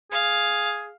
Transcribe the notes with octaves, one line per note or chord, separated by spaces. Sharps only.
G#4 F5